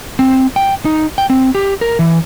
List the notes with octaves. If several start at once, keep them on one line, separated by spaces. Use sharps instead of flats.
C4
G5
D#4
G5
C4
G4
A#4
E3